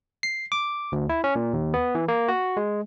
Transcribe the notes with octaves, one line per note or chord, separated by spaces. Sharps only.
C7
D6
D2
E4
C#4
A#2
D#2
B3
E3
A#3
F#4
G#3